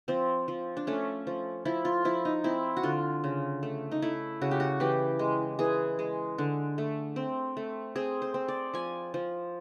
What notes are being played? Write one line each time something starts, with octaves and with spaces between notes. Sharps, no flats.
F3 C4
F3
D4
A3 C#4
F3
F3 E4
F4
F3 E4
D#4
C4 E4
F#4
D3 F4
C#3
A3
D#4
A3 E4
C#3 F#4
G4
F#4
E3 G4
G#3
E3 G#4
G#3
D3
A3
C4
A3
C4 G#4
C5
C4
D5
F3 G#5
F3